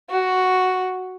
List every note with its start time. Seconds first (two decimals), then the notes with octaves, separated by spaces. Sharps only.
0.10 F#4